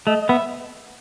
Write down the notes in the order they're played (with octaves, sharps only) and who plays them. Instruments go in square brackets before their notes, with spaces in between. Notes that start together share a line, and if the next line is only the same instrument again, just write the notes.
[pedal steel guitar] A3 [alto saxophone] D#5
[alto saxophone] D#5
[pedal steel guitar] B3 [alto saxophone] E5